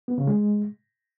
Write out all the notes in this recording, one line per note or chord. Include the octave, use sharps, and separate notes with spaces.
B3
C#3
G#3